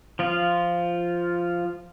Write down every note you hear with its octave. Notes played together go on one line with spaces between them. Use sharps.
F3 F4